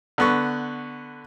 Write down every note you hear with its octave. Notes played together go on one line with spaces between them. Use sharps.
D3 B3 C#6